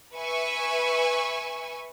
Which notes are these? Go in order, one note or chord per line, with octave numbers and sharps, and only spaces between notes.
B4 E5 G#5 C#6